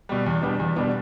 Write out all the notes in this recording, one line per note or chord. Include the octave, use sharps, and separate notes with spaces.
B2 G3
E2
B2 G3 B3 D4
E2
B2 G3 B3 D4